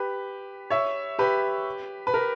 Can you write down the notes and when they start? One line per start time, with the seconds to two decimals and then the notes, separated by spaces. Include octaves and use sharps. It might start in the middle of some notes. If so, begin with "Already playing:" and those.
Already playing: G4 B4
0.70 C#5 E5
1.19 G4 B4
2.07 B4
2.14 A#4